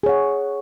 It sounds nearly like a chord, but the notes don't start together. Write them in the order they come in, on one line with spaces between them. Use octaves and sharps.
G#4 C#5 F#5